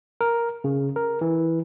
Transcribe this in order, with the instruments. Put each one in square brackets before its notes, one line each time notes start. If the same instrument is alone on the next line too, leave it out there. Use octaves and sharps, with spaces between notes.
[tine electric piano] A#4
C#3
A#4
E3